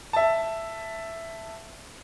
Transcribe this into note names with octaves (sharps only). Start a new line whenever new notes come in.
E5 A5